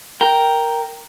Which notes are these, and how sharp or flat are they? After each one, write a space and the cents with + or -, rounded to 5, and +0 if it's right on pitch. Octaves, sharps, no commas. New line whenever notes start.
A#4 +0 G5 +0